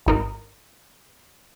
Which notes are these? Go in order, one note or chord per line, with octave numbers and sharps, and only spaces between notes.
G#1 D#4 A#4